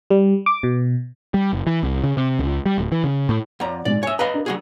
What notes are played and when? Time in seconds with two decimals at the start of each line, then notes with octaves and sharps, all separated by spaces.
0.10 G3
0.46 D6
0.63 B2
1.34 G3
1.53 F#1
1.67 E3
1.83 C2
2.04 C#3
2.17 C3
2.39 C#2
2.66 G3
2.78 D1
2.92 E3
3.04 C#3
3.29 A2
3.60 F2 C#5 D5 F#5 A#5
3.85 A#1 G#2 G#3 D5
4.03 C#5 E5 G#5 D#6
4.19 B4 D#5 F5 A#5 B5
4.34 D4 A#4
4.46 F#3 F#4 G#4